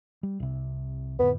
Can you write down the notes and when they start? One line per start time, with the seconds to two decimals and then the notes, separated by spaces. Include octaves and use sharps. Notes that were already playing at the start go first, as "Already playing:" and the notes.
0.23 G3
0.40 C2 C3
1.19 F2 A2 D3 B3